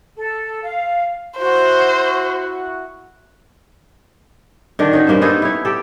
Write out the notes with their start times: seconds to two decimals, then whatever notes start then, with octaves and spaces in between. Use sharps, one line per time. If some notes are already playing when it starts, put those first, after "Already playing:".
0.16 A4
0.63 F5
1.38 E4 F#4 C5
4.79 D3 D#3 D4
4.91 C#4 D#4 F#4
5.07 G2 A#3 C4 C5
5.22 B3 D#4 G#4 A4
5.42 E4 C#5
5.65 G4 A4